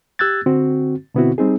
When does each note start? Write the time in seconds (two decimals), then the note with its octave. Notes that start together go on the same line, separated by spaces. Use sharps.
0.19 G4 E6 F#6 G#6 A6
0.46 D3 C4 F#4
1.15 B2 D3 B3 C4 E4 F#4
1.38 G3 C4 D#4 G#4